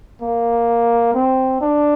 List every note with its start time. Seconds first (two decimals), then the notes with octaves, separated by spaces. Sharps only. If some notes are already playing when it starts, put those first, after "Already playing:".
0.22 A#3
1.14 C4
1.61 D4